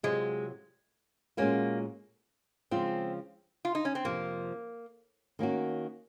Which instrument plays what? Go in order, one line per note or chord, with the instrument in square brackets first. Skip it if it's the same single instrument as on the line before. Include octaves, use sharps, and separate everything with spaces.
[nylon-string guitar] C3 F#3 C4 F4 [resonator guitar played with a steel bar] G#3
[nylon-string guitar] A#2 G#3 C#4 F#4 [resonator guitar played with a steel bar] A#3
[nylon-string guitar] C#3 F3 G#3 C#4 F4 [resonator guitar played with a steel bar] C4
[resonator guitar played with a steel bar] F4
D#4
C#4
C4
[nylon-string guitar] F2 C3 F3 [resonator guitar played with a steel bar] A#3
[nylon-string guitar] D#3 A#3 C#4 F#4